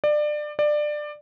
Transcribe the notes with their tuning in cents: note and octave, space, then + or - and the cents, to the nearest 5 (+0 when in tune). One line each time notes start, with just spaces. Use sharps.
D5 +25
D5 +20